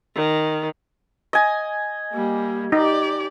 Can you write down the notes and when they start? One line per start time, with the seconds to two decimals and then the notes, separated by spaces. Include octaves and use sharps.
0.16 D#3
1.33 D#5 G#5
2.13 G3 A#3
2.72 D#4 G4 D5